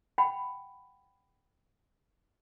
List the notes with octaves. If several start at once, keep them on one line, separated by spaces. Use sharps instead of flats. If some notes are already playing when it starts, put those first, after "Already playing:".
F#5 G5 B5